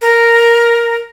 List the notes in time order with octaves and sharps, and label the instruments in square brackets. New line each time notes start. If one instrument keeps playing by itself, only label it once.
[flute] A#4